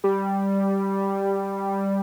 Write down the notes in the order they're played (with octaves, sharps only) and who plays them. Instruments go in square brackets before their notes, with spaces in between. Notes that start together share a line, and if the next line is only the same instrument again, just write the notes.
[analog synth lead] G3